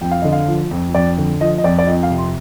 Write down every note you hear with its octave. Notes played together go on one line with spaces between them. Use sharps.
F2 G5
F5
D3 D#5
F5
F3
F2
F2 D5
D3
F3 D#5
D#5
F2 D5
D5
F2 D#5
F5
C3
C6